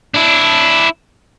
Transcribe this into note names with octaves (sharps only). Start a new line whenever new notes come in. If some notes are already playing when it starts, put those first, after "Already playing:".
D4 E4